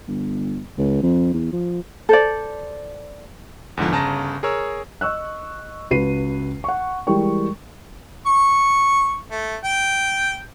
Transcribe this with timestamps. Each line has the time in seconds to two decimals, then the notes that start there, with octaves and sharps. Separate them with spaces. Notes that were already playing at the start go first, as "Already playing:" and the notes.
0.08 G1
0.78 C#2
1.03 F2
1.34 E2
1.53 F3
2.09 A4 C5 D5
3.77 E2 G#2 D3 F3
3.92 G1 C#3 A5 A#5 A#6
4.43 G#4 A#4 C#5 E6
5.01 D#5 C#6 E6 F#6
5.91 C#2 F#4 B4 C7 D#7
6.64 F#5 C#6
7.07 E3 G3 G#3 A#4 G5 C#6
8.26 C#6
9.30 A3
9.64 G5